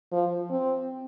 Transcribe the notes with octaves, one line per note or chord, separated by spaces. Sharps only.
F3
C4